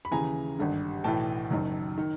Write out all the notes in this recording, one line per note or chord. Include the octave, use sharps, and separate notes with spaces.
B5
D#2 C#3 E3 G#5 A#5
G#1 G2 D3
B1 A2 E3 G5 A5
F#1 F#2 D#3
D#3